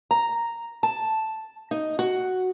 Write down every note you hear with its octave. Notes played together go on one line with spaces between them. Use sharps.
A#5
A5
D#4
F#4